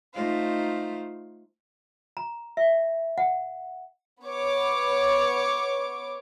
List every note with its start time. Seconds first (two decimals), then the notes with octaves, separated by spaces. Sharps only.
0.14 A3 D#4 F4 C5 F5
2.17 A#5
2.57 E5
3.18 F#5
4.23 B3 C#5 D6